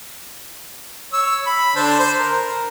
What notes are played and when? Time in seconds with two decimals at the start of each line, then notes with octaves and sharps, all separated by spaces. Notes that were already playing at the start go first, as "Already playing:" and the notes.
1.13 C#5 E6
1.46 B5
1.76 D3 D4 C5
1.99 C5
2.18 A#4